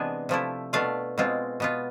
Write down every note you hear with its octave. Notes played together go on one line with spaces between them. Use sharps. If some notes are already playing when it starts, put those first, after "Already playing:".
Already playing: C3 E3 G#3 B3 D4 G#5
C3 F3 A3 E4
B2 A3 D4 F4 F5
B2 G#3 C4 F4
B2 B3 F4